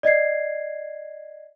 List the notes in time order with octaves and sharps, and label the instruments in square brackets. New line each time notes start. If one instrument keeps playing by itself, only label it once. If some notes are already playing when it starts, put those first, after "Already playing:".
[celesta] D5 D#5 G#6 C7